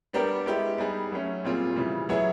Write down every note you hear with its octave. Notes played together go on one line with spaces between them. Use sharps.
G3 B3 D4 G4 A#4
G#3 B3 E4 G4
G3 B3 D#4 G#4 B4
F#3 A3 C#4
A#2 G3 C4 F4 G#4
C#3 E3 G3
F#3 B3 E4 G#4 C#5